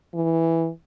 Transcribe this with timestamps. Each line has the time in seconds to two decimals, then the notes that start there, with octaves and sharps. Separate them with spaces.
0.14 E3